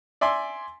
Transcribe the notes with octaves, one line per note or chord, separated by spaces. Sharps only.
D5 E5 G#5 C6